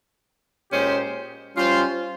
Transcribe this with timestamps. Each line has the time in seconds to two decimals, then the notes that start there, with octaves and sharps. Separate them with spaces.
0.71 A#2 G#3 C#4 G4 C5
1.54 G3 C#4 F4 C5